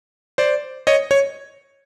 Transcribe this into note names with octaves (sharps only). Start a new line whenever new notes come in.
C5 D5
C#5 D#5
C#5